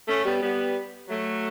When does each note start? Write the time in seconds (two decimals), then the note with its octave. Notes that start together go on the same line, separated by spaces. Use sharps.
0.08 A3 C#4
0.25 G3 B3
0.42 G3 B3
1.09 F#3 A3